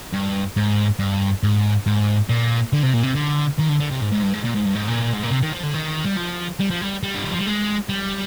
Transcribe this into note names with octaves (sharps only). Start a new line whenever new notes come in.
G2
G#2
G2
G#2
G#2
A#2
D3
C3
A#2
C3
D3
D#3
D3
D3
C3
G#2
G#2
G2
G#2
A#2
G#2
G2
G#2
A#2
G#2
A#2
C3
D#3
F3
D3
D#3
G3
F3
G3
F3
G3
G3
D3
D#3
F3
G3
G#3
G3